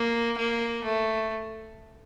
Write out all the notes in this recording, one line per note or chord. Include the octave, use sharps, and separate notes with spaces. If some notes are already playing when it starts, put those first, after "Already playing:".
Already playing: A#3
A#3
A3